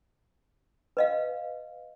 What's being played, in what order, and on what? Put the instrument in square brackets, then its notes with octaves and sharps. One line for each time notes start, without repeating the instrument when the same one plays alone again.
[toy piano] B4 D#5 F5